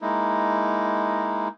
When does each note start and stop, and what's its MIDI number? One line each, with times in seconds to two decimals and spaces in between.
0.02 1.48 56
0.02 1.48 58
0.02 1.48 63
0.02 1.48 64